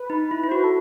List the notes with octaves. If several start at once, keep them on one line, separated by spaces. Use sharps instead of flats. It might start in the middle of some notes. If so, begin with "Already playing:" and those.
Already playing: B4
D#4
E4
E4
C5
F#4
B4
A4